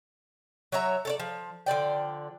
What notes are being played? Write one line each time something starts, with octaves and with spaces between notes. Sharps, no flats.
F#3 C#5 E5 A#5
A4 C#5 D5
F3
D3 F3 D5 G5